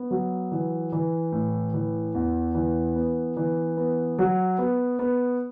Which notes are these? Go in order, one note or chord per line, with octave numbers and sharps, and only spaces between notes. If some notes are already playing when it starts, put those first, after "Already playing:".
Already playing: B3
F#3
E3
E3
A2
E3
E2
E3
B3
E3
B3
F#3
B3
B3